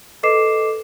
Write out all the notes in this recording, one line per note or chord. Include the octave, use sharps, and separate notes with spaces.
A4 B4 D#5 D6 C7 E7